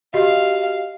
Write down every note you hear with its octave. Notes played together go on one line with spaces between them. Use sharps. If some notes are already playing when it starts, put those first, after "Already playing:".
F#4 G4 D#5 F5